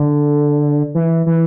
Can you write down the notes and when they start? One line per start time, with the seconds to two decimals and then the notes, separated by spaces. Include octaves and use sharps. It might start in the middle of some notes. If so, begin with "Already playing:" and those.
Already playing: D3
0.95 E3
1.26 E3